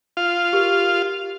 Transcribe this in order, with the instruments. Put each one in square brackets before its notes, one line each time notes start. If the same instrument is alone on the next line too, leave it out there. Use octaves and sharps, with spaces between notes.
[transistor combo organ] F4 F5
[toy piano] G4 A#4